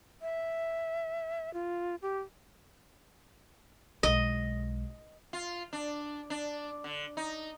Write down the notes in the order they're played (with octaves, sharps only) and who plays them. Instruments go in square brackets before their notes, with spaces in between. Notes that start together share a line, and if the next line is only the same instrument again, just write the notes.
[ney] E5
F4
G4
[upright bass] B1 G#3 [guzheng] D#5
[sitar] F4
D4
D4
D3
D#4